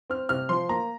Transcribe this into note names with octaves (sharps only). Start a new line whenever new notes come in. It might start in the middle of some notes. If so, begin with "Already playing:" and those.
C4 F6
C3 F6
F3 C6
A#3 A#5